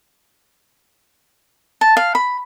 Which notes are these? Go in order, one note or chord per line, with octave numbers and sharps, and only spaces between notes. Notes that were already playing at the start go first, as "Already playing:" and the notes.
A5
F5
B5